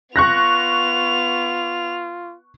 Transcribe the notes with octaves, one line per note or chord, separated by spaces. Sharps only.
B3 F4 C#6 F#6 A#6 F7